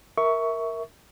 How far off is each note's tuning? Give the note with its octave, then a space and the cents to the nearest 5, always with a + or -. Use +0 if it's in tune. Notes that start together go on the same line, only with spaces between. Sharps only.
A#4 +0 E5 -15 C#6 +15